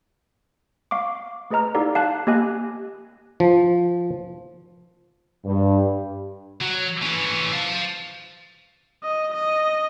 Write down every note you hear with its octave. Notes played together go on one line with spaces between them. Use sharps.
F5 C#6 D6
A3 G#4 B4 D#5 A#5 F6
D#4 E4 G4 A4 D5 F5
F5 A5 F#6
A#3 G4 D#5 G#5 F#6
F3
G2
F#3
E3 C#4
F5 A5
D#5
D#5